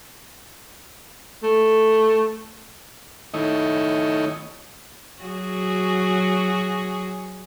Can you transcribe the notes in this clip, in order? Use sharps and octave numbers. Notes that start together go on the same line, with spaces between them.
A3
D#3 A3 D#4 E4 C#5 D#5
F#3 F#4 G#4